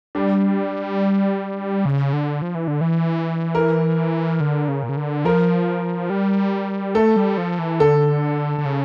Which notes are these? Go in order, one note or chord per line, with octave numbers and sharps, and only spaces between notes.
G3 D4
C#3
D3
F3
E3
D3
E3
A#4
D3
C#3
A#2
C#3
D3
F3 A#4
G3
A3 A4
G3
F3
E3
D3 A4
D3
C#3